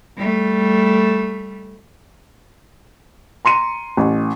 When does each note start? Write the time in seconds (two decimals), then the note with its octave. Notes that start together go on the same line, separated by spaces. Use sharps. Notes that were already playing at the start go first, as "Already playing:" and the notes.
0.17 G3 A3
3.45 A#5 C6 C#7 D#7
3.97 A1